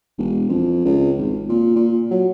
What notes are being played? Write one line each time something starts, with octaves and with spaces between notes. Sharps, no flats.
E1
F2
C#2
G#1
A#2
A#2
F#3